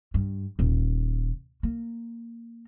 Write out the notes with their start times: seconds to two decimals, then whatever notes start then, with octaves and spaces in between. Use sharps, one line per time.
0.14 G2
0.59 D#1
1.63 A#3